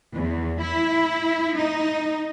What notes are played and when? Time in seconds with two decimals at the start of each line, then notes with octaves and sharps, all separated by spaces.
0.14 E2
0.62 E4
1.58 D#4